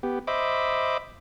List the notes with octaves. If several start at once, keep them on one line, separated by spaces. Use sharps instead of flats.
B3 G4
C5 D#5 E5 B5 D6